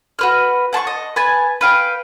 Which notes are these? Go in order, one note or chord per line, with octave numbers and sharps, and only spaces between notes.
F#4 B4 F6
F#5 A5 C6 C#6
D#5
B4 G#5 A5
B4 F5 G5